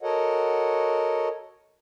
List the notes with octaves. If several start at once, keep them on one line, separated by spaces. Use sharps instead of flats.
F#4 A4 A#4 C#5 D#5 F#5